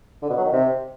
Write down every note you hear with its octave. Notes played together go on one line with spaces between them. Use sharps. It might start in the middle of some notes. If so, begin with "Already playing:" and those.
D3
B2
F#3
D#3
C3